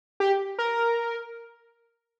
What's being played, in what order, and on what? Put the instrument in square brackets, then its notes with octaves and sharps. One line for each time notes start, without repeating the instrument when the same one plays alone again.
[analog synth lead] G4
A#4